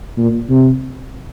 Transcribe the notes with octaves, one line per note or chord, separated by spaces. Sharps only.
A#2
C3